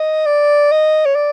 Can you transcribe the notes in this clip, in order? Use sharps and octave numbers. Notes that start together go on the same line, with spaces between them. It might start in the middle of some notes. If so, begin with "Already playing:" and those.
Already playing: D#5
D5
D#5
C#5
D5